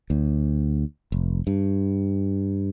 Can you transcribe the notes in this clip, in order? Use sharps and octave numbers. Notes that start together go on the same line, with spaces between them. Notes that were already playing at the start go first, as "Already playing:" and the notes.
D2
F1
G2